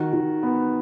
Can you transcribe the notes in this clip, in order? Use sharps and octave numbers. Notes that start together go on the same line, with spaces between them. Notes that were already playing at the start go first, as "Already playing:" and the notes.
Already playing: D#3 F#4
D#3
B3